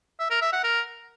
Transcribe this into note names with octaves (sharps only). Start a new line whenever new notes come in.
E5
A#4
E5
F#5
A#4